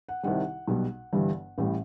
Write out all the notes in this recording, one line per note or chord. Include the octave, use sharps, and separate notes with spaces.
F#5
C2 C3 D#3 G3 F#5
B1 B2 G3
G1 G2 E3 G3
A1 A2 E3 G3